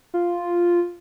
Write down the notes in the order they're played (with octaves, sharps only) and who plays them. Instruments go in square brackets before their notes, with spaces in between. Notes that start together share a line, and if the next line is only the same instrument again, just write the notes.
[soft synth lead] F4